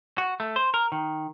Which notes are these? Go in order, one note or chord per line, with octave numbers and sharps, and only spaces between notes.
F#4
A3
C5
A#4
D#3